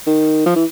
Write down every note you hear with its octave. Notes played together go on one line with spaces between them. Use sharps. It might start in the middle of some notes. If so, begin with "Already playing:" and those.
D#3
F3
E3